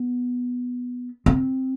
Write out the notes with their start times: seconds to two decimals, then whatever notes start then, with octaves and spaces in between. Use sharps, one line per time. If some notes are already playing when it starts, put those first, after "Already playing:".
Already playing: B3
1.26 C4